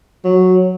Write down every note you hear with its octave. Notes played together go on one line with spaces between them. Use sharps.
F#3